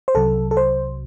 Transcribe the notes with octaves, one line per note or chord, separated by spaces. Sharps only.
C5
C2 C3 F#3 A4
A4
C5